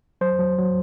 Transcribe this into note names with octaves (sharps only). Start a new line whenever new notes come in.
F#3 C5
F#3
F#3